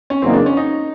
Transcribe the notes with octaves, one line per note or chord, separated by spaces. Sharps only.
C#4
E2 C#3 F#3 A#3 C4 D#4
D4
C#4
D#4